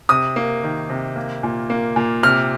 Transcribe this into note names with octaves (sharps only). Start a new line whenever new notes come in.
C3 D#6
A#3
D#3
C3
A#3
A#2
A#3
A#2
C3 F6